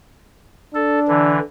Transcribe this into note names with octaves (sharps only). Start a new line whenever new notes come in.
D4 A4
D3 E3